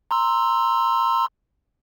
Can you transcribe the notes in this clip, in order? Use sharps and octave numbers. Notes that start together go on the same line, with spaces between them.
A#5 C6 E6